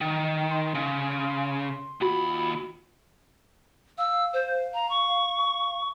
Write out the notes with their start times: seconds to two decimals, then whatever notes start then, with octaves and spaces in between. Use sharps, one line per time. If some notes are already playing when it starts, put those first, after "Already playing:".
0.01 D#3
0.51 C6
0.75 C#3
2.01 D#2 F4 F#4 B5
3.98 F5 E6
4.33 C5
4.74 A#5
4.89 C#6